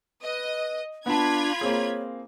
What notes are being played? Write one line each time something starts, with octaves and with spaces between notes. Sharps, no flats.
B4 D#5
B3 D4 F4 A5 B5 G#6
A#3 C4 G#4 C#5